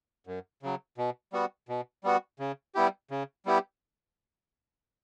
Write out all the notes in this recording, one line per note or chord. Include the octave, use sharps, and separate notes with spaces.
F#2
C#3 F#3
B2
G3 B3 F#4
B2
G3 B3 F#4
C#3
G3 B3 E4 G4
C#3
G3 B3 E4 G4